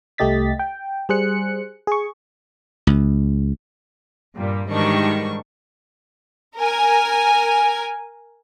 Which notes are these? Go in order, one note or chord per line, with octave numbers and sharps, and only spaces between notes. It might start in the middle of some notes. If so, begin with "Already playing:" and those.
C2 A3 G4 D#5 A6 B6
G5
G3 G#4 C5 F#6 C#7
G#4 C#6
C#2
G2 A#2 G3
G#2 D#3 E3 G3 D4 C#6
A#4 G#5